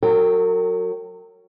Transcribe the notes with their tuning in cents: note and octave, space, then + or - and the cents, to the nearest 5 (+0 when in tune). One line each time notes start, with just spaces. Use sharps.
F#3 -10 A#4 -45 G5 +0